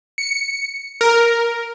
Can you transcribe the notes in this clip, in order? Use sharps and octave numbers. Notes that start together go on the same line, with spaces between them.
C#7
A#4